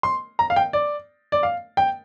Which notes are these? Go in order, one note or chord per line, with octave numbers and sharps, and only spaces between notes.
C6
A#5
F5
G5
D5
D5
F5
G5